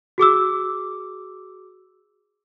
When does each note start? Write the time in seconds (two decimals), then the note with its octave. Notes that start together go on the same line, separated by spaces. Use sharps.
0.18 F#4 G#4 D6 E6